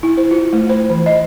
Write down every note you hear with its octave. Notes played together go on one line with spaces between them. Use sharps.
E4
C5
F4
A3
C5
E3
D#5